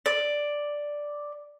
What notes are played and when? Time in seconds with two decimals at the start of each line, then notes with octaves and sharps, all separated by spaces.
0.06 D5